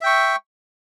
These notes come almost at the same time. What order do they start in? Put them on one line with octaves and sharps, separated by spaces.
E5 G5 C#6